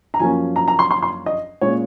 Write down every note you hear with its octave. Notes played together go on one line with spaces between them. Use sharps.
A#5
F#2 F3 A#3 C#4 G#5
A#5
A#5
C6
C6
C6
D#5
A#2 G#3 C#4 C#5